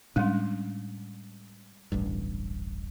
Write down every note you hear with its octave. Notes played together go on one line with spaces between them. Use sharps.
A2 G3 G#3 C#4 D4
D1 A1 G2